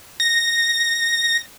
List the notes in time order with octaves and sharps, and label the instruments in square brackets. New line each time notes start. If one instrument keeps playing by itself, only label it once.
[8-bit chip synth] A#6